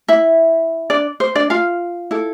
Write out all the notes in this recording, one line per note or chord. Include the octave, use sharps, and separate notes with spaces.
E4 E5
D4 D5
C5
D4 D5
F4 F5
E4 A4